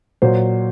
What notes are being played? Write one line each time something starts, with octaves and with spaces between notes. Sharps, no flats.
A#2 F#3 C5